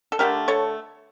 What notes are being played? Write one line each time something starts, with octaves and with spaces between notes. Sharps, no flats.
A4
D3 A3 G4 A#4
A4 C#5